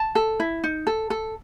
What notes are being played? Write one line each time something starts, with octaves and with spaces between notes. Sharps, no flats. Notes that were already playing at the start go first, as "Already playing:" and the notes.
Already playing: A5
A4
E4
D#4
A4
A4